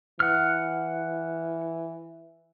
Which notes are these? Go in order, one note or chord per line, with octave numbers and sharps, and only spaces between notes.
E3 F#5 F6